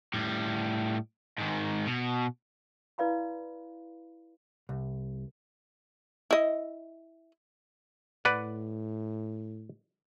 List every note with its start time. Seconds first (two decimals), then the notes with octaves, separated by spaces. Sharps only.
0.14 A2 G3
1.38 G#2 D#3
1.86 B2
2.98 E4 B4 D5 F5 B5 C6
4.69 C2
6.31 E4 D#5
8.25 A2 B4 D5 F#5